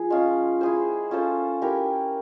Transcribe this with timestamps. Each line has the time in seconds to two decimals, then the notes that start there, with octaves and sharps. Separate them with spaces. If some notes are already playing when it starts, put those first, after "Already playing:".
Already playing: F3 G#4
0.10 G#3 C#4 F4
0.61 E4 G#4 C5
1.11 C#4 F4 A4 C5
1.62 E4 G4 A#4